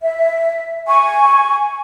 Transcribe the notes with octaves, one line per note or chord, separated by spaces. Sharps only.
E5
G#5 C#6